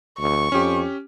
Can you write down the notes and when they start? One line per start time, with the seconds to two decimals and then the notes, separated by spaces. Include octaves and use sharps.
0.19 D2 C#6
0.52 F2 C#4 G4